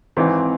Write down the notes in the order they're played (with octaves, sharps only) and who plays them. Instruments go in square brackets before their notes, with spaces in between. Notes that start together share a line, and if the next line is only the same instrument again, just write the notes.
[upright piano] G#1 G#2 E3 C4